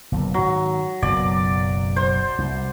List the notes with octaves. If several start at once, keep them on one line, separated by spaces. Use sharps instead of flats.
F#1 B1 C3
G#2 D#3 F#3
F#1 B1 F#2 D5
C5
C2